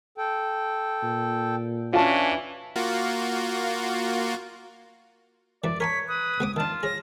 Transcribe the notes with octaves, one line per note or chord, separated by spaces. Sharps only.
A4 G5
A#2
E3 C#4 D4 F4 C#5 A5
A#3 F4 F#4
F#2 E3 D5
A#4 C#5 G#5 A5 B6
B4 D#6
C#2 B3 D6
D#3 D4 F4 A5
G#4 C#5 A#6